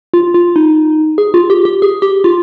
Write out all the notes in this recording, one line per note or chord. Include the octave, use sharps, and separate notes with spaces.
F4
F4
D#4
G#4
F4
G4
G4
G#4
G4
F4